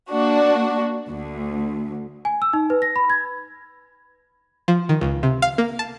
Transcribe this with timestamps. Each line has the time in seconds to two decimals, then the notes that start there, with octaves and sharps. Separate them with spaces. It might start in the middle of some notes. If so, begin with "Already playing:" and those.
0.11 A#3 D4 F#4
1.08 D2
2.25 G#5
2.42 E6
2.53 D#4
2.70 B4
2.82 A#6
2.96 B5
3.10 G#6
4.68 F3
4.89 D#3
5.01 C#2
5.23 C3
5.42 F5
5.58 A#3
5.79 A5